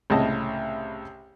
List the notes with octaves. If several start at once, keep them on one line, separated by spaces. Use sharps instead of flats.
C2 A2 C#3 D#5 A5